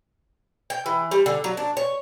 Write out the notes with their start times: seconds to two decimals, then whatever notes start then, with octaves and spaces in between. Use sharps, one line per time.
0.70 G5
0.86 E3
1.11 G3
1.26 D3
1.44 F#3
1.57 D4
1.77 C#5